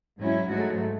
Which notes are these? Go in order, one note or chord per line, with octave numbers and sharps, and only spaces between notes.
G#2 F#3 C#4 E4
G#2 F#3 A3 F#4